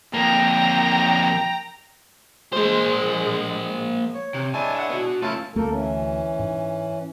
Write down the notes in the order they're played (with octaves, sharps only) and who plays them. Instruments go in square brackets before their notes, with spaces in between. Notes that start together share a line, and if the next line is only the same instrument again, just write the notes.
[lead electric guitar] F2 A#3 [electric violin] G5 A#5
[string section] G#3 [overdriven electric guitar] A#3 C5
[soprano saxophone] C#5
[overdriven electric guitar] C3
[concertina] G#3 E4 C#5 [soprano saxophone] D4 [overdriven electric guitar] G#5 A5
[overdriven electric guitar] E5 F#5
B3 F#4
[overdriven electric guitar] A3 F4 [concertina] C#4 E4 F5 [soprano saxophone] A5
[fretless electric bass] D2 A3 [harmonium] A#3 A4 A#4
[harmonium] E3 C#4
[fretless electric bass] G#2